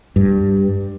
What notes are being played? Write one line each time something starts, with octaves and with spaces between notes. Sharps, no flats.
G2